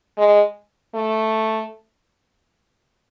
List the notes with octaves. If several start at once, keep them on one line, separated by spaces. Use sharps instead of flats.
G#3
A3